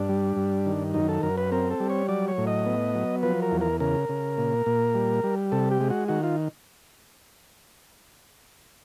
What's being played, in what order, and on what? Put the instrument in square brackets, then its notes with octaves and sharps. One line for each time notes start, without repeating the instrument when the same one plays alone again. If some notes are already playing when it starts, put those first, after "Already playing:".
Already playing: [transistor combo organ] G2 D4
G3
G2
D#3
F#2 D#4
A4
F#2 A#4
B4
C4 A#4
A4
G3
C#5
F#3 D5
C#5
A2
D#5
B3
F#3
F3 B4
A#4
E2
A#4
C#3 A#4
C#3
A#2
A#2
G3
G3
C3 A4
G4
G#3
F#4
D#3 F#4
F4